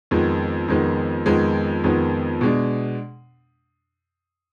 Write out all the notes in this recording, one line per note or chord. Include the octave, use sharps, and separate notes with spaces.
F2 D#3 G#3 B3
F2 D#3 G#3 B3
F2 D#3 G#3 B3
F2 D#3 G#3 B3
B2 G#3 D4